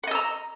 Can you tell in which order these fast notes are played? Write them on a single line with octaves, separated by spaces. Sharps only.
F#5 D#5 E6 A#5